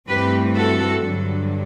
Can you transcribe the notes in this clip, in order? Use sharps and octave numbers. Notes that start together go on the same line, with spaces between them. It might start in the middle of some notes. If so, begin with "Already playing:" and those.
G2 E3 A3 C4 G4 B4
F#4 A4
G2 D3 F#3